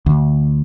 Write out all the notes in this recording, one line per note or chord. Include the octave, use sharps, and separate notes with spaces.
D2